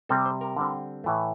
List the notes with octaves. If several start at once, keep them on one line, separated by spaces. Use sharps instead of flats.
C3 G3 C4 A4
C5
A#4
D3 G3 C4
A2 E3 A3